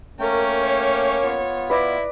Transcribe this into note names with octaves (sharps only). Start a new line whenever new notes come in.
A3 A#3 C#4 A#4 G5
C#5
B3 F4
E4 B4 D5 D#5